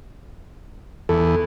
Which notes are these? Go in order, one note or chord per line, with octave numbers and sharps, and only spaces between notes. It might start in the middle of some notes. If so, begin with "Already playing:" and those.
E2 A4